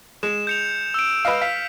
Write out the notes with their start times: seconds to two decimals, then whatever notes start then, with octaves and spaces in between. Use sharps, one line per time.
0.23 G#3 E7
0.47 G6 C#7 F7
0.94 E6 D7
1.25 B4 D#5 F5
1.42 F5 B6